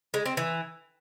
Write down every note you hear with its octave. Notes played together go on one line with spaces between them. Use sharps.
G#3
C4
E3